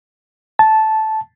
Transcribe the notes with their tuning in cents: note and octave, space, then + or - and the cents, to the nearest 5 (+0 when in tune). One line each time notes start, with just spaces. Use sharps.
A5 -10